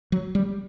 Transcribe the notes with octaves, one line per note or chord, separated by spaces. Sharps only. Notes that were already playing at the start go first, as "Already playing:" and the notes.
F#3
G3